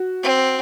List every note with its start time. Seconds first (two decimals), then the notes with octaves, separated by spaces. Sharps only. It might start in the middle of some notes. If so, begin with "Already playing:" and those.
Already playing: F#4
0.23 C4